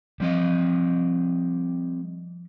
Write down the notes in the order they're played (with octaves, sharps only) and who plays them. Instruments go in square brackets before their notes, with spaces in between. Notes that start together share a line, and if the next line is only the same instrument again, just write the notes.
[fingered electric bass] F3 [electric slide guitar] G3 C4 D#5